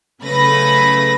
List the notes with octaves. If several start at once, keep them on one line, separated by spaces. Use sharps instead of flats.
C#3 F#3 A3 B4 B5 A#6